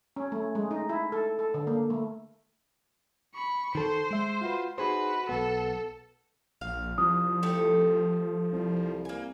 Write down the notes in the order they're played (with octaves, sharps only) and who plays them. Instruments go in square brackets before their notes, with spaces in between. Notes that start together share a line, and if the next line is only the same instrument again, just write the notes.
[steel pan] C#4
A3
G#3
D#4
E4
A4
A4
D3
A#3
A3
[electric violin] B5 C#6
[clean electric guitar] D#3 A4 [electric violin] C5
[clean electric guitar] G#3 E5
F4 F#4 B4
[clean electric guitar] D#4 G#4 C5 [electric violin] F#4 B4
[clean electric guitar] B1 B3 [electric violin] A4
[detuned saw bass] A#1 [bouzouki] F5
[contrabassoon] C2 [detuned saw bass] F3 [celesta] D#6
[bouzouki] A3 G4 A4
[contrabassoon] C2
[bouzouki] A#3 G#5